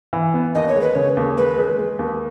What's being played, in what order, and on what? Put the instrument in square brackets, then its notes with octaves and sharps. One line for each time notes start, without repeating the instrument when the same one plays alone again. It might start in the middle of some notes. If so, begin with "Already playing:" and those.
[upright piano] E3
B3
[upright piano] D#2 [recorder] D#5
[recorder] C#5
[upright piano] G#3
[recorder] B4
[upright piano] C#3 [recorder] C#5
[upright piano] D#2
[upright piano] G#3 [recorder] B4
[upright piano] G#3
G#3
D#2